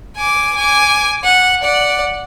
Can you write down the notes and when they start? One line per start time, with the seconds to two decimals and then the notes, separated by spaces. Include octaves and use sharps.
0.16 G#5 D6
0.55 G#5 D6
1.24 F#5
1.63 D5 F#5